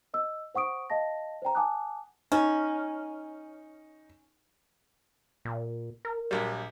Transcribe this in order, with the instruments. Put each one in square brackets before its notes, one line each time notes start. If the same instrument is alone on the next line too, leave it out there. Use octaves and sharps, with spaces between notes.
[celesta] D#5 E6
C5 F#5 C#6 D#6 D7
D#5 F5 A5 A#6
C5 D5 G5 A#5
F#5 G#5 A5 D6 D#6 F#6
[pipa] C#4 [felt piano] D#4
[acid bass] A#2
A#4
[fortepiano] A#1 F#3 G3